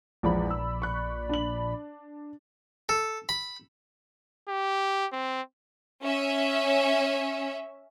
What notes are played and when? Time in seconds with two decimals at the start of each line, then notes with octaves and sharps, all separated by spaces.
0.23 A#1 E2 F3 G#3 D5 B5
0.50 E6
0.82 C#6 F#6
1.29 D4 F#7
2.89 A4
3.29 B5
4.48 G4
5.13 C4
6.03 C#4 E5